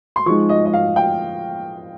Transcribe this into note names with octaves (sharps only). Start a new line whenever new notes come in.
C6
F3 G#3 D#4 C#6
D#5
D#5
F5
G5